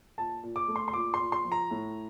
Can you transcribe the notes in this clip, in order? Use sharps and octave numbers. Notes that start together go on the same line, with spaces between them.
A#2 A5
A#2
D6
A3
C6
C6
A#2 D6
C6
A#2
C6
F3
A#5
A2